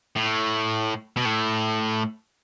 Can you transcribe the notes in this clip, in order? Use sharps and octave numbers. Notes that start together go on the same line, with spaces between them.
A2
B2
A2